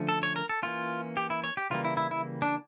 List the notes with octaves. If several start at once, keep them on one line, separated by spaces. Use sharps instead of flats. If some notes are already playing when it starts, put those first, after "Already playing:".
Already playing: D3 F3 A3 C#4
A4
C#5
A#4
A4
E3 A#3 C#4 F4
G4
E4
C#5
G4
C#3 E3 G3 A#3 F4
E4
E4
E4
D4